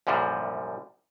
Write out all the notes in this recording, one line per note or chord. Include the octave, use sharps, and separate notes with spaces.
C2 F#2 A#2 D3 F3 G3